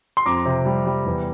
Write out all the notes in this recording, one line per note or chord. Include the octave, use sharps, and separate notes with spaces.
C6
F2 A#5 D6
C3
G3
G3
E2